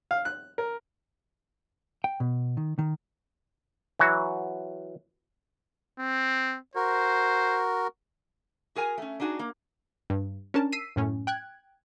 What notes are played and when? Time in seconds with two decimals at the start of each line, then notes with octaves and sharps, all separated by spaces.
0.11 F5
0.25 F#6
0.58 A#4
2.04 G5
2.20 B2
2.57 D#3
2.79 D#3
3.99 E3 F#3 F#4
5.99 C4
6.75 F#4 A#4 C5
8.75 F#4 G#4 A#4 G#5
8.98 A3 C#4
9.20 D4 D#4 F#4 G#4
9.39 A#3
10.10 G2
10.54 C#4 D4 A#4 A5
10.72 E6 B6 C7 D#7
10.96 F#2 A2 C#4
11.27 G5 F#6 G#6